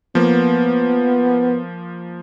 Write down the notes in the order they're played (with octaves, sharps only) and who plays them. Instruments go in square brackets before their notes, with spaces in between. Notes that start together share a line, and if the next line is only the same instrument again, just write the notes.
[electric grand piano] F3 A#3 [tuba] B3